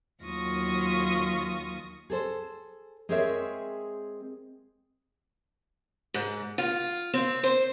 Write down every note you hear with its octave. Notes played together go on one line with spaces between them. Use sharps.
D#2 F#3 F4 C#6 D#6 A#6
G#4 A4 C5
G#3 C4 G#4 A#4 C#5 E5
G#2
F4
C4
C5